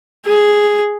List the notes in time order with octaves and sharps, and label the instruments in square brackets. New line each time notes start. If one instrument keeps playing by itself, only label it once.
[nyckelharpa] G#4